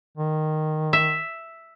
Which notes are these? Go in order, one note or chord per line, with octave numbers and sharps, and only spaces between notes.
D#3
E5